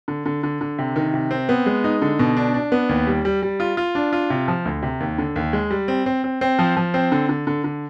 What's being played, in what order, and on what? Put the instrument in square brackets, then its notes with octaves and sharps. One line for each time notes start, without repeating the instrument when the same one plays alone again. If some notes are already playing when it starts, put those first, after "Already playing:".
[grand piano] D3
D3
D3
D3
C3
D#3
C3
C4
B3
G#3
D#4
D3
B2
D4
D4
B3
D#2
G3
G3
G3
F4
F4
D4
F4
C3
F3
D2
C3
D#2
D3
D#2
G#3
G3
C4
C4
C4
C4
F3
F3
C4
D3
D3
D3
D3